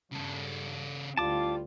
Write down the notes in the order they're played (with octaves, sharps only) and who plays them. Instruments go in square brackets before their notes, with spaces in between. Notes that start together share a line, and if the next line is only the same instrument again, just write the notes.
[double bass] G2 [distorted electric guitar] C#3 A4
[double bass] D2 [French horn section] G3 E4 F4 [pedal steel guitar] A5 D6